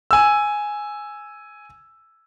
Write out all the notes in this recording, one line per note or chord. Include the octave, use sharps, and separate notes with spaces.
G#5 E6